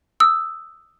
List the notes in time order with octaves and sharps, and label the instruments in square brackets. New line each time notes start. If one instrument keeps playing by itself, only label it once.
[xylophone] D#6 E6